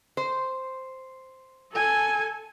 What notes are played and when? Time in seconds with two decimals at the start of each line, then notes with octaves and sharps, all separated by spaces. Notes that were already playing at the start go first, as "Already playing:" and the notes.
0.17 C5
1.73 A4 G#5